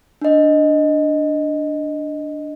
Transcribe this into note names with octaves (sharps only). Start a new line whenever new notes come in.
D4 D#5